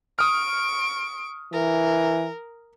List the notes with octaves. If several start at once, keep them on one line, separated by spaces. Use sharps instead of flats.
C#6 D#6 F6 D7
E3 A#4